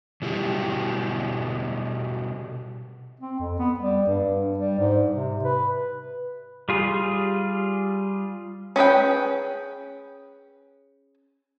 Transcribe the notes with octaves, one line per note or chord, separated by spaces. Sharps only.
B2 G3 E4 F#4 G4
C4
F2
B3
G3
G2
G3
G#2
C3
B4
G3 F4 G#4
C#4 G#4 B4 G5